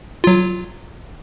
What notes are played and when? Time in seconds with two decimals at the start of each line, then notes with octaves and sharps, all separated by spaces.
0.24 F#3 F4